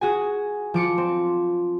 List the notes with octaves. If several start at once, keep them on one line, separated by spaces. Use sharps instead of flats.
F#4 G#4 G#5
F3 D6 C#7
C4